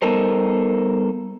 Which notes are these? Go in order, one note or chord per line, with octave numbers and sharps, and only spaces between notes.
G3 B3 D#4 A4 A#4 C5